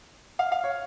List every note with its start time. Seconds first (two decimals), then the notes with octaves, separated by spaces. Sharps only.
0.39 F5
0.52 F5
0.64 C#5